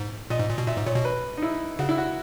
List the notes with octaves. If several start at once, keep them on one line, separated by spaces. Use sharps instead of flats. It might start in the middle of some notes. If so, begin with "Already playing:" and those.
Already playing: G#2
A#2 D#5
G#2
A#2
B2
A#2 E5
G#2
A#2 C#5
B2
B4
D#4
E4
C#3 F#4
E4
F#4